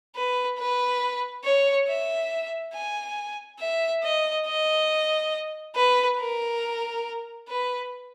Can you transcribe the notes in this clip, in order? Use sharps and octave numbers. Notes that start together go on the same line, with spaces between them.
B4
B4
C#5
E5
G#5
E5
D#5
D#5
B4
A#4
B4